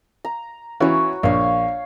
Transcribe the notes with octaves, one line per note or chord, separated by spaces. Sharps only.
A#5
E3 C#4 F#4 C#5
A#1 C#5 F5